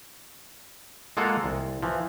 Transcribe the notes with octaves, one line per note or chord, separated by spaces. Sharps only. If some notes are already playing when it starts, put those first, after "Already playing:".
G#3 A#3 F4 A4 F5 F#5
C2
E3 F3